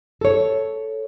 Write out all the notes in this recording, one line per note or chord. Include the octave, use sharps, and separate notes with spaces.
A4 C#5